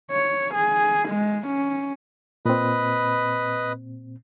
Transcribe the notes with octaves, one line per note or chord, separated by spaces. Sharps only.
C#5
G#4
G#3
C#4
A#2 C4 B4 D#5 B5